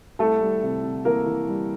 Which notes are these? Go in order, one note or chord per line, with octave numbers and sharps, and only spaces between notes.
C2 A3 A4
G3
C3
C3
E3 A#3 A#4
E3
G3